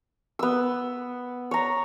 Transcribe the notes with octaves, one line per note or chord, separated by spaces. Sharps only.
B3 E6
C#5 A#5